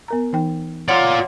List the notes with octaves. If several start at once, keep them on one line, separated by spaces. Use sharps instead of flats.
B3 A#4 A#5
E3 D#4 G5
F4 C#5 D5 F#5 C6